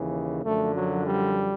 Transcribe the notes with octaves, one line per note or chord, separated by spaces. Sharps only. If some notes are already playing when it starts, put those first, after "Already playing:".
Already playing: D#2 C#3 E3
F#2 D3 F3 A3
F#3
G3